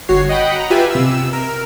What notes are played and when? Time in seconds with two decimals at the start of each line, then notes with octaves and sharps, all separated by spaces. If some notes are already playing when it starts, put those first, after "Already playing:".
0.08 G1 F#4 C#5 C7
0.29 D#5 F#5 G5 B5
0.56 A#5
0.70 F4 G4 B4 E5 G#5
0.91 C3 E6
1.33 A#4